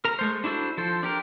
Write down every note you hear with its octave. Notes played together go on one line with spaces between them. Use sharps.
A#4 A#5
G#3 A3 C5
D4 E4 F#4 A4 C5
F3 A4 C5
D4 G4 A#4